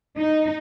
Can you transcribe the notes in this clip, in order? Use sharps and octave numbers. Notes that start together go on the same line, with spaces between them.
D#4